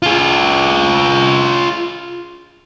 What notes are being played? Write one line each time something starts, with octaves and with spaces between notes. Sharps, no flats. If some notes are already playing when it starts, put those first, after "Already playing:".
F4 G#4